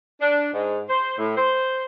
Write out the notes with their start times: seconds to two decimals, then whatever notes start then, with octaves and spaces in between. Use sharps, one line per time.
0.21 D4
0.53 G#2
0.89 C5
1.18 A2
1.37 C5